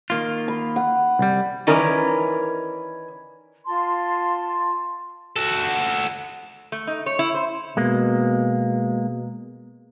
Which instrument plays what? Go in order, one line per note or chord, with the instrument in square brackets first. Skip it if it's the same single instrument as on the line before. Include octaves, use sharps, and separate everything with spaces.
[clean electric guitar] D#3 A#3 F4
[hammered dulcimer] B5
F#5
[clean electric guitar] C2 G3
[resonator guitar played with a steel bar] D#3 E3 C#4 A#4 D5
[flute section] F4 A5 C6
[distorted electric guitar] F#4 A4
[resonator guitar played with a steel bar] A3
D#4
C#5
E4
C5
[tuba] B2 [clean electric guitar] G#3 A#3